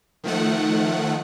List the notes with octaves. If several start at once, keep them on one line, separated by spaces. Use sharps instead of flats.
D#3 F3 A3 F#5